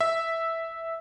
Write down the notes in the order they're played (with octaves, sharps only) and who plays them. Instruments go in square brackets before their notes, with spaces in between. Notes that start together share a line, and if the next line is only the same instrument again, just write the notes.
[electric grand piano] E5